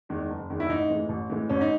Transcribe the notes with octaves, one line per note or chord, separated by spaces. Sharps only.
E2 D#3 G#3
F#1
E2 D#3 G#3
E4
A1 D#4
A2 E3 G#3
A1
A2 E3 G#3
A1 C#4
D#4